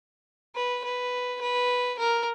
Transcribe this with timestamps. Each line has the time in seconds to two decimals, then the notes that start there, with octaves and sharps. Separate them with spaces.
0.56 B4
0.84 B4
1.42 B4
1.99 A#4